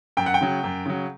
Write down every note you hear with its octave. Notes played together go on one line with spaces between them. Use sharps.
F#2 G5
F#5
G5
C#3 F#3
F#2
C#3 F#3